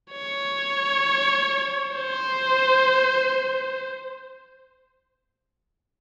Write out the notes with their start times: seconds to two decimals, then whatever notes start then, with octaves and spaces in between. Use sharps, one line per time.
0.11 C#5
1.95 C5